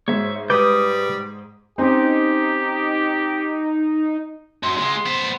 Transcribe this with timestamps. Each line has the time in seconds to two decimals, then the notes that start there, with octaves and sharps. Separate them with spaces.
0.08 G#2 C#5 E5
0.50 G3 B4 D6 D#6 G6
1.78 C4 C#4 D#4 G4
4.63 F#2 C6
4.77 C#2 G#3 C6
5.06 B3 C5